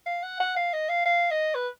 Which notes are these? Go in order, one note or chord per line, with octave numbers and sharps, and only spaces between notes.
F5
F#5
F#5
F5
D#5
F5
F5
D#5
B4